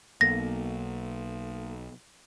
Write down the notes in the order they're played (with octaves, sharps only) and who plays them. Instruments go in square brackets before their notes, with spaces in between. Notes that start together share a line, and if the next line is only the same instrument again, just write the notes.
[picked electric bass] B1 [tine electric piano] A#3 B3 A4 [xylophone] A#6